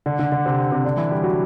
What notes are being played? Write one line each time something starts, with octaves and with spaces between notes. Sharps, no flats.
D3 D4
D3 D4
D3 D4
C3 C4
C3 C4
D3 D4
E3 E4
G3 G4
F#3 F#4